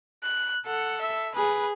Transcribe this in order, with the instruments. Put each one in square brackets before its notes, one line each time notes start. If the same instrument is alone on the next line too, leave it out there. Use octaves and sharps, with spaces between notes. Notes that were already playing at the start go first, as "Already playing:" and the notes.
[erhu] F#6
[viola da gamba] A4 [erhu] F#5
[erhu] E5
[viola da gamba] G#4 [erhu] B4